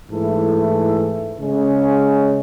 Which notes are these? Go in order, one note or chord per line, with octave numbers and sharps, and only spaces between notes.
G#2 E3 A3 E4 A4
C#3 G#3 C#4